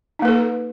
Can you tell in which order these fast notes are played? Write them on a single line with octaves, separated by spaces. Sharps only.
D#4 A#3 B4 A4